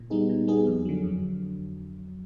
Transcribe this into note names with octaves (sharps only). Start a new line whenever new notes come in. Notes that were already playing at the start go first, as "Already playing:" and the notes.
Already playing: A#2
G3 B3 D#4 G#4
A#2
G3 B3 D#4 G#4
F2
D3 F#3
F2